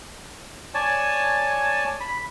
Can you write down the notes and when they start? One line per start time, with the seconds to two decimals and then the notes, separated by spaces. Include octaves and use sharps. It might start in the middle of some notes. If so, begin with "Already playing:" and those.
0.74 C#5 D5 G#5 A5
2.00 B5